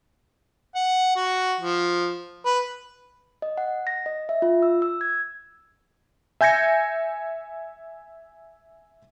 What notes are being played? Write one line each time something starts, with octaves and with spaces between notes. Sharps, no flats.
F#5
F#4
F3
B4
D#5
F#5
A#6
D#5
E5
F4
E6
E6
G#6
E5 G#5 G6 G#6 A#6 C#7